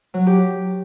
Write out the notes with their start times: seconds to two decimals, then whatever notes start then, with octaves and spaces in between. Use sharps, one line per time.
0.14 F#3
0.27 G4